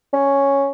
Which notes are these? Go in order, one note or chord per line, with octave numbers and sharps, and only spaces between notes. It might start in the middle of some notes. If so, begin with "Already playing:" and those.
C#4